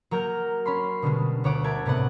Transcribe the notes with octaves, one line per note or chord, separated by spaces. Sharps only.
F#3 A#3 A#4 A#5 F6 G6
C#4 B5 C6
B2 D3 G3 G#3
D2 C#5 F#5 D6
A#4 E5 A5 G#6 D7
A2 C3 B3 D5 F#5